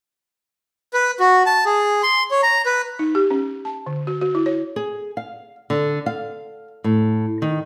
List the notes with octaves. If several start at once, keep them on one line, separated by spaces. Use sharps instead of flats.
B4
F#4
A5
G#4
C6
C#5
A#5
B4
D#4
G4
C#4
A5
D3
F#4
F#4
E4
C#5
G#4
F5
D3
F5
A2
D#3